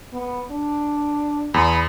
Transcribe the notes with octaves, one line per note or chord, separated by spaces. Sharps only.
B3
D4
E2 B5